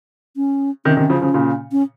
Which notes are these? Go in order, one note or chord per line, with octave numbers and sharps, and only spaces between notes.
C#4
C3 D#3 C#4
C3 D#3
C#3 F3
C#3 F3
A#2 C#3
C#4